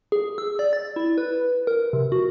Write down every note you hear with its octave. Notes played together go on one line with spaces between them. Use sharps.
G#4
E6
D5
A6
E4
B4
A#4
C3
F#4